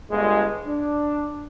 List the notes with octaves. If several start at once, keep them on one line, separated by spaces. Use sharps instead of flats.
G1 G#3
D4